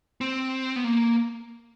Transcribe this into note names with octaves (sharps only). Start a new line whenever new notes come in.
C4
B3
A#3